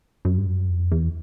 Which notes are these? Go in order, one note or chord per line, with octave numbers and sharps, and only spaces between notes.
F#2
G2
F#2
F2
E2